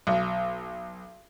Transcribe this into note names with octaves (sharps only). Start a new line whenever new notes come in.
B1